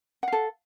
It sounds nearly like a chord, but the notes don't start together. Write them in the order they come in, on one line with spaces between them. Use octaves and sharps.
F#5 F5 A4